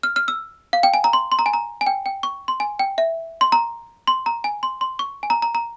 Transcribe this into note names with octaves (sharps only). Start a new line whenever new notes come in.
F6
F6
E6
F5
G5
G#5
A#5
C6
C6
A#5
G#5
A#5
G#5
G5
G5
C#6
C6
G#5
G5
E5
C6
A#5
C6
A#5
G#5
C6
C6
C#6
G#5
A#5
A#5
A#5